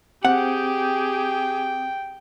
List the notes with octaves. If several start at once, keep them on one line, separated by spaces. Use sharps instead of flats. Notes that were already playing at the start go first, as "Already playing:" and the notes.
C4 G4 G#4 F#5 G5